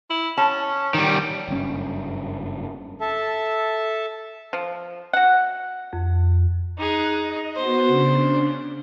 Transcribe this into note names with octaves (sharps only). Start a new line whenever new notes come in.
E4
C#4 A5
D#3 G3
F#1 G2 C#4
A4 E5 A5
F3
F#4 F#5
F2
D#4 G#4 F#6
D#5
B3 F#4 C5
C#3 D4